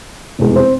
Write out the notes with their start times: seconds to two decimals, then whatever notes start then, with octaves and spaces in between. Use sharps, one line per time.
0.39 F1 E2 B2 G#3
0.56 C4